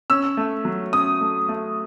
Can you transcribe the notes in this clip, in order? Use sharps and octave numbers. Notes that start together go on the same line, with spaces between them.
C#4 E6
A3
F#3
C#4 D#6
A3
A3